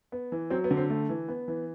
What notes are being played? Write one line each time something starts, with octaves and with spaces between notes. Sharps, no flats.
B3
E3
F#3 C4
B3
D3
C4
A3
E3
B3
E3